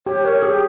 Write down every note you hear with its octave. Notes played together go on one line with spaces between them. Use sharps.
G4 C#5
A#4 C#5
G4 G#4